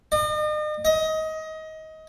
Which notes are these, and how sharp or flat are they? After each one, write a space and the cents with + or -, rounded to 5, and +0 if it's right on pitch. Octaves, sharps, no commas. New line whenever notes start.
D#5 -40
D#5 +25